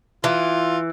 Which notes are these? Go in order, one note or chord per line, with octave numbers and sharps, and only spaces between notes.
E3 F4